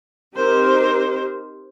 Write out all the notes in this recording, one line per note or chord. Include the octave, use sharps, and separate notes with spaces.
C4 D#4 G4 A#4 C5